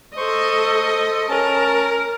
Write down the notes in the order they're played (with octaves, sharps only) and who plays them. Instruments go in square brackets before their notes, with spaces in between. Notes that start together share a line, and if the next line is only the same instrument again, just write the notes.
[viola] A4 D#5 [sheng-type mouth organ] C5 C#6
[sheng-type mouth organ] C#4 A5 [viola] A#4